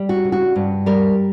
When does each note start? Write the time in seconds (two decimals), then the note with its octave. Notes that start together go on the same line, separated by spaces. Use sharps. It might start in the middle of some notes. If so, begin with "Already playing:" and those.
Already playing: G3
0.09 F#4
0.25 C#3
0.32 F#4
0.56 G2
0.86 G3 A#4